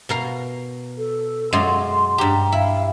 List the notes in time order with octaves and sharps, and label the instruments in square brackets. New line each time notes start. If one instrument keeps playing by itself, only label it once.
[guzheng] B2 A#4 F5
[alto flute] A4
[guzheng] F#2 G#3 F4 [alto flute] C6
[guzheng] G2 G4 [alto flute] A#5
[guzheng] E4 [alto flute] F5